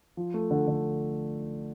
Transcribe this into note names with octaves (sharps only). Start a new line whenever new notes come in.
F3
A3
D3
D3